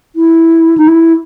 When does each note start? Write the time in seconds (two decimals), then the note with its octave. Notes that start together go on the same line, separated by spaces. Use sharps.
0.16 E4
0.78 D#4
0.88 E4